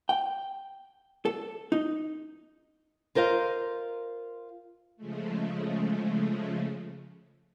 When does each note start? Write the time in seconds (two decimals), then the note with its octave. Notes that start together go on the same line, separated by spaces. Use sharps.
0.09 G5
1.25 A4
1.72 D#4
3.15 F4 A#4 C5 D#5 F5
4.97 C#3 F3 G#3 A3